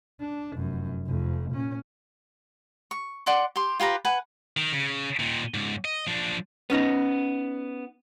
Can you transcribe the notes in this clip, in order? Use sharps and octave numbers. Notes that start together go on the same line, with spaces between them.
D4
F1 F#2
F1 F2
A#2 C#4
C#6
D5 F#5 C6 D6
G4 C6
F4 G4 B4 A#5
B4 F#5 G#5
D#3
C#3
A#2 D#3
C#2 G#2
D#5
F3 D4
B3 C#4 D#4